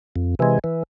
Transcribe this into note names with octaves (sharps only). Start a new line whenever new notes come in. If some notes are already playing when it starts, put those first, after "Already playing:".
F2
C3 E3 G#3
E3